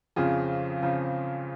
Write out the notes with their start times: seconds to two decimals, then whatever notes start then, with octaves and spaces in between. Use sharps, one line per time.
0.16 F2 C#3 F3 F4 G#4
0.82 C#3 F3